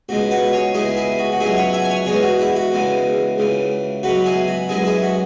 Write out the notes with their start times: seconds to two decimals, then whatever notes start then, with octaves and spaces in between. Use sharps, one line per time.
0.09 C#2 B2 G#3 F#4
0.31 F#4 B4
0.53 G#4 C#5
0.74 C#2 B2 G#3 E4 G#4
0.97 E4 G#4
1.19 F#4
1.32 F#4
1.40 C#2 B2 F#3 E4 G#4
1.57 C#5 F#5
1.73 E5 G#5
1.84 G#5
1.90 C#5 F#5
2.06 E2 E3 G#3 G#4 C#5
2.23 F#4
2.40 E4
2.56 F#4
2.72 E2 C#3 E3 G#3
3.38 C#2 C#3 E3
4.03 C#2 B2 F#3 F#4 B4
4.26 E4 G#4
4.48 F#4
4.69 F#2 E3 G#3 E4 G#4
4.85 E4 G#4
5.02 F#4